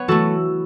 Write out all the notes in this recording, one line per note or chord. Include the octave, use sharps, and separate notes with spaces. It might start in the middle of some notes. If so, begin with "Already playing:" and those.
Already playing: B3 B4 C#5
E3 A3 F#4 A4